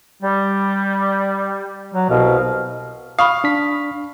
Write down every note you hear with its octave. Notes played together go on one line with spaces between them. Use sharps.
G3
F#3
C2 B2 F5
F5 B5 C#6 D#6
D4 B6